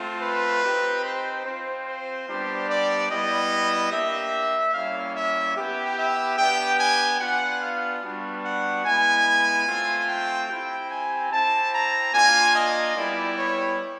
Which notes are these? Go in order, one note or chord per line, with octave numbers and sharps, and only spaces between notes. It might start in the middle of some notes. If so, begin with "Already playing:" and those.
Already playing: A3 C4 F4
B4
C4 D#4 G4
C5
C4 F4 C5
C5
G3 B3 D4 G4
D5
G3 B3 E4 G4 D#5
A#3 D4 G4 E5
G3 A#3 C#4 E4 F5
E5
B3 E4 G4
E5
B3 D4 G4 G5
G#5
B3 D4 F4 F#5
F5
G3 B3 D4 F#4
F#5
G#3 B3 E4 G#5
A3 C4 F4
G5
C4 E4 G4 G5
G#5
C4 E4 G4 A5
A#5
A#3 D4 F4 G#5
D#5
G3 B3 E4 G4 D5
C#5